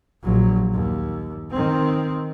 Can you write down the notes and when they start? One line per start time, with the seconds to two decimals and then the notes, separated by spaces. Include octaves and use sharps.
0.23 A#1 F#3
0.73 D#2
1.51 D#3 C4